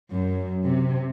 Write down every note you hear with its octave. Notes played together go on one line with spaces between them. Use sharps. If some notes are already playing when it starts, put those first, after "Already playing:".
F#2
C3